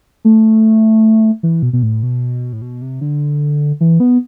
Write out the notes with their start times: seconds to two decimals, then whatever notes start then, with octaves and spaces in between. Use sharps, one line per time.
0.25 A3
1.43 E3
1.63 B2
1.73 B2
1.83 A2
2.03 B2
2.53 A2
2.62 B2
2.82 C3
3.01 D3
3.81 E3
4.00 B3